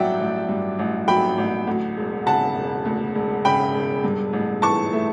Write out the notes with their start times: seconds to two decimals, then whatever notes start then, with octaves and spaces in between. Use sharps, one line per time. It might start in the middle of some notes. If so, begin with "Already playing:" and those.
Already playing: A1 G2 F#3 D5 E5 F#5 G5
0.20 A1
0.49 G2
0.79 A1
1.08 F#3 G5 B5
1.38 A1
1.67 D2
1.97 E1
2.26 C#3 F#5 A5
2.56 E1
2.85 D2
3.15 E1
3.45 C#3 G5 B5
3.74 E1
4.04 G2
4.33 A1
4.62 E3 A5 C#6
4.93 A3